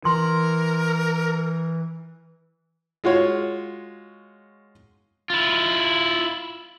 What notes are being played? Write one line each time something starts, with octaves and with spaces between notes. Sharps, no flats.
E3 A#4 C6
G#3 F4 F#4 C#5
E4 F4